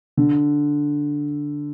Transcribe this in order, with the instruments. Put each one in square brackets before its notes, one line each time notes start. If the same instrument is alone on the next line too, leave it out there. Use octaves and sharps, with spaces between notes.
[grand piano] D3